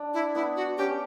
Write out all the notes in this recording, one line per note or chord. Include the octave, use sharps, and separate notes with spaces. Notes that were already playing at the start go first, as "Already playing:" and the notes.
Already playing: D4
E4
B3 E4
F#4
C#4 G4